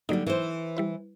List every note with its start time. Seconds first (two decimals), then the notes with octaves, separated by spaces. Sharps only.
0.09 D3 F#3 G3 A#3 D#4
0.27 E3 C5
0.77 G3 E4 B4